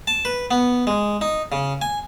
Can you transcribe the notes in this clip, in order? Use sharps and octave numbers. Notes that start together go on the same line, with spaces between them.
A5
B4
B3
G#3
D#4
C#3
G#5